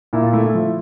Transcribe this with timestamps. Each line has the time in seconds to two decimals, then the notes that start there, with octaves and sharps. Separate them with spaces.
0.13 A#2 E4
0.23 F4
0.33 A3 E4
0.44 E4
0.54 F3 E4